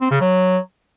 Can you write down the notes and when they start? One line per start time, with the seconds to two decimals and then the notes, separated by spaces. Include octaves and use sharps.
0.01 C4
0.11 C#3
0.21 F#3